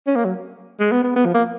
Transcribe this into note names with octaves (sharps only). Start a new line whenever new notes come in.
C#4
A#3
F#3
G#3
B3
B3
B3
F3
A#3